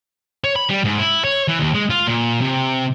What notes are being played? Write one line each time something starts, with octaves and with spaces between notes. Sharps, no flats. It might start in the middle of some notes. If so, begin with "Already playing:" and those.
C#5
B5
G3
G#2
E4
C#5
E3
D#2
G#3
F4
A#2
C3